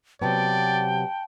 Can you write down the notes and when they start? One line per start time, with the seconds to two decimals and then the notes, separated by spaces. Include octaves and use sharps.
0.22 C3 F#3 B3 D5 G5 A5